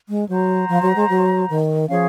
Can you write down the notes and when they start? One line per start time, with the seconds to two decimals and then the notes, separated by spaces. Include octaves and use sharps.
0.09 G#3
0.29 F#3 C5 F#5 A#5
0.69 F3
0.82 F#3
0.96 G#3
1.09 F#3
1.50 D#3
1.90 F3 C#4 G#4 C#5 F5